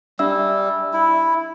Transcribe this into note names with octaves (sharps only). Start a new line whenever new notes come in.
G3 D4 E5 E6
E4